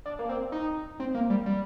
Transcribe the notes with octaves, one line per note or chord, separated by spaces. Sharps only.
D4
A#3
C4
D#4
C4
A#3
G3
G3